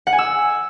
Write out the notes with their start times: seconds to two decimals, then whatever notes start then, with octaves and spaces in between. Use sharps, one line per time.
0.07 F#5
0.13 G#5
0.18 E6